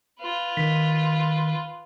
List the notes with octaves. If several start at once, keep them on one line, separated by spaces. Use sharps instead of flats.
F4 B4
D#3 B6